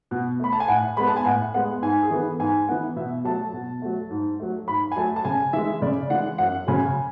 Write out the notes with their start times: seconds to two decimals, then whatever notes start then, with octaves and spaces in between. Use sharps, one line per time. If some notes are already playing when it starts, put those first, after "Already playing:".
0.11 B2
0.40 A3 B5
0.53 A5
0.60 G#5
0.68 A2 F#5
0.97 G#3 B3 B5
1.07 A5
1.16 G#5
1.25 A2 F#5
1.54 G#3 B3 F#5
1.82 G#2 G#5
2.03 G#4
2.11 E3 B3 A4
2.39 G#2 G#5
2.68 E3 B3 F#5
2.96 B2 E5
3.25 F#3 A3 A5
3.53 B2
3.82 F#3 A3
4.10 G#2
4.39 F#3 A3
4.68 G#2 B5
4.92 G#5
4.96 F#3 A3 A5
5.16 A5
5.25 C#3 G#5
5.53 E3 G#3 E5
5.82 C#3 D5
6.10 E3 G#3 F#5
6.38 F#2 F#5
6.67 C#3 F#3 G#5